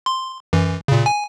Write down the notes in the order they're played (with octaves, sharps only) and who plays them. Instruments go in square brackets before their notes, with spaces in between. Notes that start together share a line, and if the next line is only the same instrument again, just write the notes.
[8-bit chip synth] C6
F#2 E3
A#2 C#3
G#5